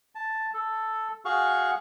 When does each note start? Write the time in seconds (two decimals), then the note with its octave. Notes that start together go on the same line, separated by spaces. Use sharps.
0.15 A5
0.54 A4
1.25 F#4 G#4 F5 C#6